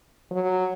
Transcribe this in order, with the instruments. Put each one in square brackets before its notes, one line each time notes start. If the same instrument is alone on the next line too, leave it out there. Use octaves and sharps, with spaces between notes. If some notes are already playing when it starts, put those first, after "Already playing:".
[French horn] F#3